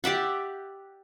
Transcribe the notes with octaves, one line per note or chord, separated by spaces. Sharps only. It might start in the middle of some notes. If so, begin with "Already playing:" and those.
G4 D5 E5 F#5